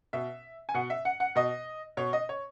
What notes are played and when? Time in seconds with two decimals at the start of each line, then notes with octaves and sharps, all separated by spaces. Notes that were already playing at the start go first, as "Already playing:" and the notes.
0.13 B2 E5
0.69 G#5
0.74 B2 F#5
0.90 E5
1.05 F#5
1.20 F#5
1.36 B2 D#5
1.97 B2 C#5
2.13 D#5
2.29 C#5